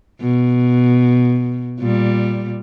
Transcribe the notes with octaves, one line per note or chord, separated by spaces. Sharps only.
B2
A#2 G3